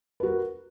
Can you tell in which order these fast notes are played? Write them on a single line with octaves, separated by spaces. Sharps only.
B4 F#4 A#4